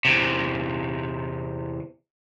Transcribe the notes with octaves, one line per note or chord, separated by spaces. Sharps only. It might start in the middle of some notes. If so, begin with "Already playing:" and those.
E2 C3